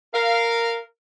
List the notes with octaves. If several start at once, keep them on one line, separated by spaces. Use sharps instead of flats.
A#4 F5